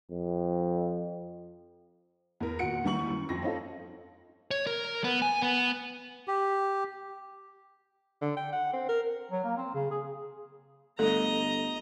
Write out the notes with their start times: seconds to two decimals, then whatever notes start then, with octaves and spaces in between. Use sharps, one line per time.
0.11 F2
2.40 E2 A#4
2.59 D#2 A#2 F#4 F#5 C#7 D7
2.84 D#2 E3 G3 E4 C#6 F#7
3.10 F#2
3.29 F2 A#6
3.42 C4 C#4 D#4 F4 A4
4.51 C#5
4.67 A#4
5.04 B3
5.22 G#5
5.42 B3
6.28 G4
8.22 D3
8.37 G5
8.53 F#5
8.73 C4
8.89 A#4
9.31 F#3
9.44 A#3
9.57 C4
9.74 C#3
9.91 G#4
10.99 G1 A3 A4 D#5 A#5